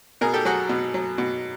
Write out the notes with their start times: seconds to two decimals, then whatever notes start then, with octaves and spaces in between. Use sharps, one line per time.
0.21 B2 G#4 A#4
0.34 G4 A4
0.45 F#3 F#4 G#4
0.69 B2
0.94 F#3
1.18 B2